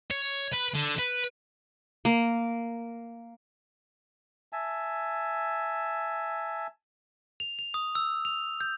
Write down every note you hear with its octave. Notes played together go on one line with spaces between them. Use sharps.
C#5
B4
D3
B4
A#3
E5 G#5 A5
F7
F7
D#6
E6
F7
G6